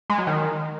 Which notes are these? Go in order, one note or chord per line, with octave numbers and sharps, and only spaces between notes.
G#3
F#3
D#3